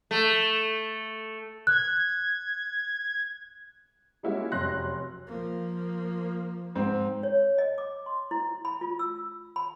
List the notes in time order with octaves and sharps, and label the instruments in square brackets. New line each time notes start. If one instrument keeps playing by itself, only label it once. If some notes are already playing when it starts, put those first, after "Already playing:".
[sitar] A3
[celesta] F#6 [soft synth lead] G#6
[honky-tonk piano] G3 G#3 A#3 C#4 E4 F#4
F1 F#2 C6 F#6 A#6
[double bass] F3 A#3
[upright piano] G#2 C4
[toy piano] C#5
D#5
D6
C6
E4
B5
F4
E6
B5